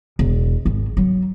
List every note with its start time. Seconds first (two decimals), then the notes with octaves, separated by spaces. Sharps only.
0.19 E1
0.66 G#1
0.97 F#3